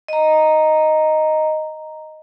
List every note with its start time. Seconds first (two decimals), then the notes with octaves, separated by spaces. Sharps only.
0.08 D#5 A#5